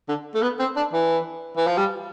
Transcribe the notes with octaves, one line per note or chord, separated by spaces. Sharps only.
D3
A3
B3
C4
D4
E3
E3
F3
G3